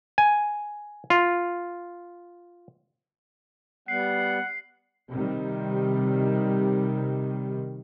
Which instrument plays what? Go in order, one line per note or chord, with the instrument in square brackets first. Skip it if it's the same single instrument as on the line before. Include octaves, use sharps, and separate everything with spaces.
[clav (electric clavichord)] G#5
F4
[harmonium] G3 B3 [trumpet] F#5 [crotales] C7
[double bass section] C3 D#3 G3